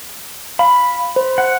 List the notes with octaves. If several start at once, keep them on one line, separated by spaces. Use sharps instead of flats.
F5 B5
C5
F#5